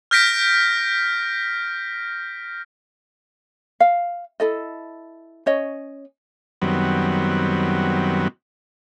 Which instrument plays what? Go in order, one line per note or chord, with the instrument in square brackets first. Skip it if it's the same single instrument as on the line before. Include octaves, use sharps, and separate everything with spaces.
[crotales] F6 G6 A#6 B6 D7
[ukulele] F5
E4 A4 D#5
C#4 C#5 D#5
[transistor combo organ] F#2 D#3 F#3 G3 B3 C4